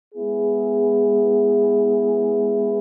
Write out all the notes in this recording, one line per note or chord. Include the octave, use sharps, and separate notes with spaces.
G#3 B3 E4 G#4